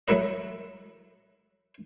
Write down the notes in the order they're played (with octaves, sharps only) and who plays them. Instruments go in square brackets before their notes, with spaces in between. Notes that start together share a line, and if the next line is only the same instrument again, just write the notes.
[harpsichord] F#3 A3 E4 B4 D#5